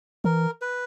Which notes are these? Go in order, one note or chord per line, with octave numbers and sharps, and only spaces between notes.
E3 A#4
B4